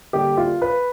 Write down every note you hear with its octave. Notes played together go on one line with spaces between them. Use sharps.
D3 G3 A#3 G4
F4
B4